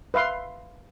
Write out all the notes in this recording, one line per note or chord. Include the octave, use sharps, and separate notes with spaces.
B4 E5 F5 C6